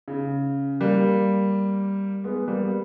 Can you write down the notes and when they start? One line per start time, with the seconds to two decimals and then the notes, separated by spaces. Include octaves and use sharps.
0.08 C#3
0.81 G3 A#3
2.24 G#3 B3
2.48 G3 A#3